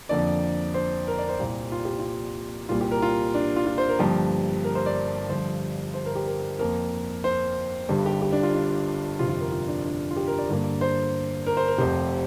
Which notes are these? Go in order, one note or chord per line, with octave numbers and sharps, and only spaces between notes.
F2 D3 F3 A#3 D5
C5
A#4
D5
C5
C2 A#2 G3 A#3 G4
F4
G4
F4
C2 A#2 G3 F4
G4
A#4
F4
D4
F4
F4
C5
A#4
G1 G2 F3 A#3 G4
A#4
C5
D5
G1 G2 F3 C5
C5
A#4
G4
A#4
F2 F3 A#3 A#4
C5
G1 G2 G3
G4
G4
D4
F4
D4
G1 F2 C3 F4
F4
A#4
F4
D4
D4
F4
G4
A#4
D5
G1 G2 D3 A#3
C5
A#4
C5
A#4
F1 F2 C3 C5